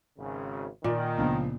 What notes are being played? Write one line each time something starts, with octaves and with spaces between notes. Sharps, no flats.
G#1 C#3
A#2 D#3 D5
C#2 F3 A#3 B3 D4